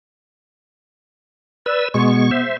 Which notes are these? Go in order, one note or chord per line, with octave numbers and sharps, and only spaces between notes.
B4 D5 E6
B2 G#3 B3 C#6
C5 E5